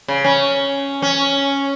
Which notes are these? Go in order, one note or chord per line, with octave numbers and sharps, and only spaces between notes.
C#3
C#4
C#4